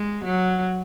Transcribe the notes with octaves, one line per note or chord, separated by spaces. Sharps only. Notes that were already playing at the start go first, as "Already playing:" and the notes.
Already playing: G#3
F#3